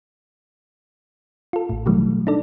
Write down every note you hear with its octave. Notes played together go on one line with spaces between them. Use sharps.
F4 A4
A1 A2
B2 D#3 E3 F#3 G3 A3
D4 D#4 A4 D5